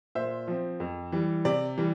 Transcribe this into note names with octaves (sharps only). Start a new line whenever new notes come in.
A#2 C5 E5
F3 C4
F2
E3 G3
C3 D5
E3 G3